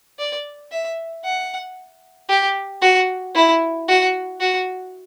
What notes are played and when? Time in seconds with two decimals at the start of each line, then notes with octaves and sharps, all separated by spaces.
0.19 D5
0.71 E5
1.24 F#5
2.29 G4
2.81 F#4
3.34 E4
3.88 F#4
4.40 F#4